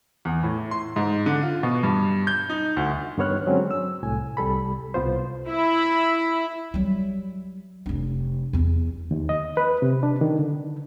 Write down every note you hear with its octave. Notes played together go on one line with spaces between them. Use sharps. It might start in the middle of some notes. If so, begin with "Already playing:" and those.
E2
A2
C6
G#2
D3
F4
B2
G2
G6
D#4
D2
G2 D#3 B3 C#5 F6 F#6
D3 F#3 G#3 C4 C#4
E6
C2 A2 G#5
C2 G3 A4 B5
C2 B2 B3 F4 C5
E4 E5 B5
F#3 G3
F1 D4
E2 B3
D#2
D#5
B4
C3
D4
D#3
D3